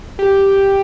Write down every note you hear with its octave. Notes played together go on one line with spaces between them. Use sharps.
G4